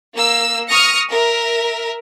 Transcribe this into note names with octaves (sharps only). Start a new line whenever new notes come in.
A#3 E6
C#6 D#6 F6 A#6 C#7
A#4 E5